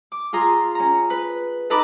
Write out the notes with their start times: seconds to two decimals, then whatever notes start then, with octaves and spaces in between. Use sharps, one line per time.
0.12 D6
0.33 F4 G#4 A#5 C6
0.75 C#4 A#5
1.10 B4
1.70 D#4 A4 B4 A#5 B5 D6